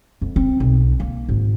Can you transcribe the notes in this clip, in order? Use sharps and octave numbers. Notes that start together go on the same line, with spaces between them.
F2
C4
B1
A#3
G#1